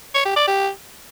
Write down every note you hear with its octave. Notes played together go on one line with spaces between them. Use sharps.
C#5
G4
D5
G4